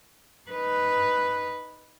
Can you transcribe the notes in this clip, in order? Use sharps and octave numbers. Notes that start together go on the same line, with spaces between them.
D#4 B4